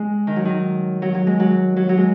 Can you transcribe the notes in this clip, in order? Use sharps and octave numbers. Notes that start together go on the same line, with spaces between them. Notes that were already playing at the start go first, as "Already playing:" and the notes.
Already playing: G#3
D#3
F#3
D#3
F#3
F#3
G#3
F#3
F#3
F#3
G#3